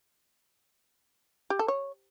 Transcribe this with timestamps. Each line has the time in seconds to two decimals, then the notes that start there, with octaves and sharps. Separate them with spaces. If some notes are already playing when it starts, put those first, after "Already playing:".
1.50 G4
1.59 A4
1.68 C#5